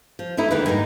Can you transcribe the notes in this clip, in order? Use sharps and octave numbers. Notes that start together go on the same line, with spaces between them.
F3
E3 A3 D#4 E4
E2 D3 D#3 G#3 A#3 B4
G#2 A#3 D#4 G#5